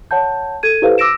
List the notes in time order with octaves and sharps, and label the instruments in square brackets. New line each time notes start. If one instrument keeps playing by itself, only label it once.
[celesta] C#5 F#5 A5 G6
A4 G#6 D#7
E4 G4 A4 B4 C5 F5
D6 E6 A#6 D7 E7